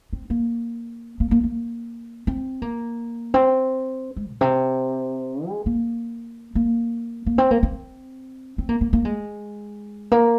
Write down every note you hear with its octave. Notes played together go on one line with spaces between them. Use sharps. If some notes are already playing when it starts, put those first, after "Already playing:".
C4
A#3
A#3
A#3
A#3
C4
A#3
C4
G#3
A#2
C3
G#3
A#3
A#3
A#3
C4
A#3
C4
C4
A#3
A#3
A#3
G#3
A#3